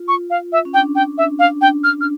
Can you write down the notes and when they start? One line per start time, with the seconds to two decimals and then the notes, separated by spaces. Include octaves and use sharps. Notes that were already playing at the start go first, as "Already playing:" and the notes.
Already playing: F4
0.08 C#6
0.30 F5
0.52 E5
0.65 C#4
0.74 D4 G5
0.95 G5
1.18 E5
1.39 D4 F5
1.61 G5
1.84 F6
2.01 F6